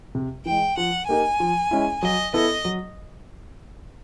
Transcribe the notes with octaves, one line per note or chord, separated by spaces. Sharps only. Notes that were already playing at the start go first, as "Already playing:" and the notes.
C3
E3 G#3 G5
F3 F#5
A#3 D#4 G4 A#4 G#5
F3
G#3 C#4 E4
F#3 D#5
B3 E4 A4 D#5
F#3